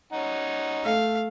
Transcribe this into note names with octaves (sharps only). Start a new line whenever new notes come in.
C#4 D#4 F#5
A3 F5